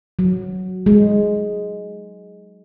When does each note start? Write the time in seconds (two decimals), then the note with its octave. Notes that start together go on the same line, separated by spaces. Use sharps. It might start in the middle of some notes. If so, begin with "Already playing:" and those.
0.19 F#3
0.86 G#3